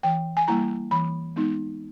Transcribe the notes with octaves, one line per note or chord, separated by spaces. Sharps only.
E3 G5
G#5
G3 A#3 E4 A#5
E3 B5
G#3 B3 D#4